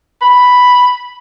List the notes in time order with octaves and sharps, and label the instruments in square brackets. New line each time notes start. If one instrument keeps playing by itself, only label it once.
[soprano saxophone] B5